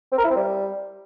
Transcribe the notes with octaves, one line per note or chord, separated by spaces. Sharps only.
C4
A#4
E4
C4
G3